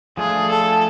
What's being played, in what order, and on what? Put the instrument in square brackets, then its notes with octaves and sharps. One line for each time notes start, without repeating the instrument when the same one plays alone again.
[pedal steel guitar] F3 A3 D4 F4 [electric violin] G#4
[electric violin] A4